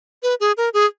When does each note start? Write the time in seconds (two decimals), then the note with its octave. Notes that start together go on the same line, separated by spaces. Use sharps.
0.23 B4
0.40 G#4
0.57 A#4
0.74 G#4